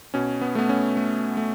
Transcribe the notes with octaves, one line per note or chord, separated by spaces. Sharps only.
B2 C#4
B3
A3 B3
C#4
A3
A3